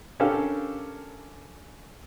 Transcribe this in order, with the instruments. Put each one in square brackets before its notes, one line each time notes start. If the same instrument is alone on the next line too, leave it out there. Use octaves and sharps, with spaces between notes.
[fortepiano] C#4 D4 G4 A4 A#4 F5